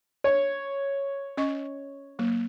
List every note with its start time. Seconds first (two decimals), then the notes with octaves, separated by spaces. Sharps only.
0.24 C#5
1.37 C#4 D#5 C#6
2.19 F#3 A#3